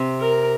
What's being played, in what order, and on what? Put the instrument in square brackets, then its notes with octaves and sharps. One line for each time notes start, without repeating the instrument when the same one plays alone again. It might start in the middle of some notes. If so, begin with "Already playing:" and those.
Already playing: [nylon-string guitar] C3
[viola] A#4